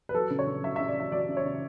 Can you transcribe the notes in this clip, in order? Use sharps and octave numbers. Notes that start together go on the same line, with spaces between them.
B4
F#3 A4
C#3
C#5
C#3
F#3 E5
C#3 E5
D5
F#3 E5
F#3 D5
C#3
C#5
C#3